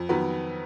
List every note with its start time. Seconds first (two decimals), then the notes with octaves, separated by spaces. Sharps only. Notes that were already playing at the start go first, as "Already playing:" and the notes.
Already playing: F2
0.09 D#3 F#3 B3